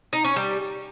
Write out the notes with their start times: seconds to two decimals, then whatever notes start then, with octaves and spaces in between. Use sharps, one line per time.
0.13 D#4
0.24 C#4
0.36 G3